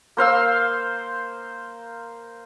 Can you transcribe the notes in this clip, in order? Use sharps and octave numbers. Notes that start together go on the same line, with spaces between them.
A#3 C5 F5 E6